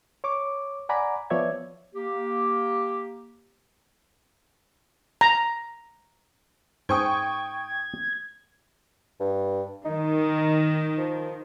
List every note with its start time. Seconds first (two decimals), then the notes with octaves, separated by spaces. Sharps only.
0.24 C#5 C#6 D6
0.89 D5 F#5 G#5 A#5 B5 D6
1.30 F3 B3 C#5 D5 E5 G#6
1.94 A#3 G4
5.21 A#5
6.89 G#2 C5 G5 G#5 C#6 D#6 G#6
9.20 G2
9.85 D#3 D#4
10.98 F3